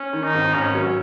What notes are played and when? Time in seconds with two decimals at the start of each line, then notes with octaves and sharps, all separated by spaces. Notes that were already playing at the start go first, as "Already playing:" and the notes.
Already playing: C#4
0.13 D#3
0.23 D#4
0.34 G#1
0.54 G#1 C#4
0.75 F#3